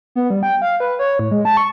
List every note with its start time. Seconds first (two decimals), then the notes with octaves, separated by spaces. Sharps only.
0.16 B3
0.30 G3
0.43 G5
0.62 F5
0.80 B4
0.99 C#5
1.19 A2
1.31 G#3
1.45 A5
1.57 C#6